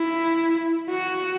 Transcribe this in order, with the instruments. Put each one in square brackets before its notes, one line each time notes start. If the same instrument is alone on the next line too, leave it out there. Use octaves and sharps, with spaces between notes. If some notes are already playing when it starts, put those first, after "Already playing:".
Already playing: [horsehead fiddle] E4
F#4